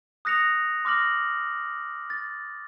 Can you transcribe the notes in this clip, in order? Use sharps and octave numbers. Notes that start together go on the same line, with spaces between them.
D#6 F#6 A#6 C#7 F7
C6 D6 F6 A#6 F#7
A6